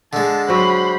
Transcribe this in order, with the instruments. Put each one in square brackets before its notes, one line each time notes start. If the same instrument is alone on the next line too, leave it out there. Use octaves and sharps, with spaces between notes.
[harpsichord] D3 G#3 [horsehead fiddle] A5
[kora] F#3 C4 [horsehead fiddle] C5 B5